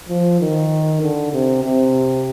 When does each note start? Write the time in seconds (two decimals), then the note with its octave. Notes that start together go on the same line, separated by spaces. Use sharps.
0.09 F3
0.41 D#3
1.02 D3
1.33 C3
1.64 C3